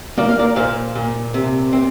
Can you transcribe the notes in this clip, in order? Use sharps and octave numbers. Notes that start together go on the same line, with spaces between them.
A#3 D5
F5
A#4 D5
A#2 C5 F5
A#2
C3
C4